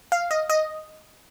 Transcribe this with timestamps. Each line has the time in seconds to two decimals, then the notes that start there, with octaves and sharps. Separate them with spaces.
0.12 F5
0.31 D#5
0.50 D#5